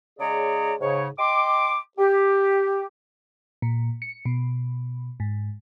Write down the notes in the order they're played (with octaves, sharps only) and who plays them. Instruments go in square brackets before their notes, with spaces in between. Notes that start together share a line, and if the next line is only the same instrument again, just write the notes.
[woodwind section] C#3 G#3 G#4 C#5 D5 A#5
G#2 C#3 C#5
D#5 G5 C6 D6
G4
[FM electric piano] A#2
C#7
B2
G#2